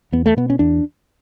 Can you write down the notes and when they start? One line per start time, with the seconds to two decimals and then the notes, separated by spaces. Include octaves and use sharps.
0.12 E2 B3
0.26 A3
0.37 B2 B3
0.50 C#4
0.59 E2 D4